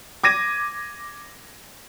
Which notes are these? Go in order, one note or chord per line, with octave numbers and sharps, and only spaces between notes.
D6 G#6 A#6 D#7